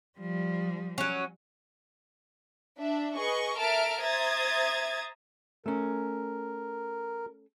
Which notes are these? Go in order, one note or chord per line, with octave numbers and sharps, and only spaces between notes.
F3 G3
F#3 C#4
D4 E5
G#4 B4 D#5 C#6
A4 A#4 E5 A5 F6 D7
C5 E5 A#5 D#6 G#6 A6
A3 C#4 A#4